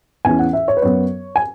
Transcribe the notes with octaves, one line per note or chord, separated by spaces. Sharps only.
E2 E3 C#4 G#5
F#5
E5
C#5
B4
F#2 F#3 B3 C#5
G#5